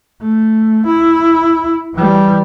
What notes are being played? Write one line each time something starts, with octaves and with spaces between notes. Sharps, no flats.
A3
E4
E3 G3